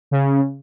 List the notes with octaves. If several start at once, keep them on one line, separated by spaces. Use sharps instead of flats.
C#3